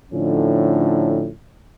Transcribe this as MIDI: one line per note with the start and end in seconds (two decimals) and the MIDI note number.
0.12 1.29 45
0.12 1.29 50
0.12 1.29 53
0.12 1.29 61
0.12 1.29 63